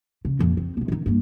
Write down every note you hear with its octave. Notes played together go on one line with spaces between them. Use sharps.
C#3
A#1 F2
C4
B1 G2
D#3 D#4
G2 A#3